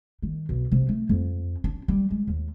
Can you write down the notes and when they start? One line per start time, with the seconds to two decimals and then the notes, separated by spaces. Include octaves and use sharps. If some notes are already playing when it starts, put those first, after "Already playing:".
0.22 D#3
0.49 B1
0.72 C3
0.89 A3
1.09 F2
1.64 D4
1.88 G3
2.10 G#3
2.27 D#2